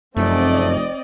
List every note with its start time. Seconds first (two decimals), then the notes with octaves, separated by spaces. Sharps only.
0.17 F1 F#2 A3 C4 D5 D#5